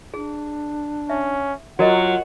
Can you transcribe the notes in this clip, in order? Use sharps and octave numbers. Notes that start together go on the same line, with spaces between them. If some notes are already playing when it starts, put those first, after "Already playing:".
D4 G#4
C#4 E5
F#3 F4 F#4 A#4 D#5 F#5